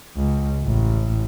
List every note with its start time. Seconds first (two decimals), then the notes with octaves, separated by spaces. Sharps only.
0.17 C#2
0.63 A1